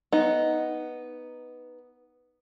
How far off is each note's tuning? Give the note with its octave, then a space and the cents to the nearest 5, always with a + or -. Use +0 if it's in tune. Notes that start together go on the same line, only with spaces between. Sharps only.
B3 +0 D#4 +0